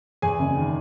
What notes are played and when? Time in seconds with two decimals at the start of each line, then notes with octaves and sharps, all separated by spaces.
0.22 E2 G#4 G#5
0.39 F#1
0.56 D#3